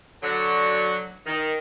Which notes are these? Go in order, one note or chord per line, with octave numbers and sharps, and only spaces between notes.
D3 F#3
D#3